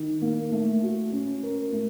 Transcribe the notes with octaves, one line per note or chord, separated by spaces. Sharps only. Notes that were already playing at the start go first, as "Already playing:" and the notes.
Already playing: D#3
A#3
A3
F#4
C#4
A#4
A3